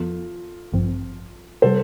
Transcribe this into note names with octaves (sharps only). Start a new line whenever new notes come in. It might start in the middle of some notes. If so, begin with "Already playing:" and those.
Already playing: F2 F3 B3 F4 A4
A1 G2 F3 C4
C3 G3 A4 C5